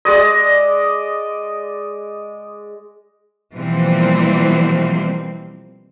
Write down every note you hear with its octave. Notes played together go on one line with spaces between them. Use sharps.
G#3 D5 D#5
B2 E3 F3 G3 A#3 C4